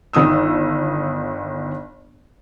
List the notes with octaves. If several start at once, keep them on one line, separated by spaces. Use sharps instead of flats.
G1 D#3 D#6 E6